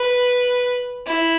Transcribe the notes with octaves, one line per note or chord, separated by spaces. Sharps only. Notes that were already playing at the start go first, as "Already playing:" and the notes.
Already playing: B4
E4